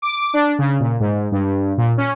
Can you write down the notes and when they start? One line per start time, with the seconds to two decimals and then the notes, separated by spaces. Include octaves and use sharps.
0.02 D6
0.34 D4
0.59 C#3
0.80 A#2
1.00 G#2
1.32 G2
1.78 A#2
1.98 C#4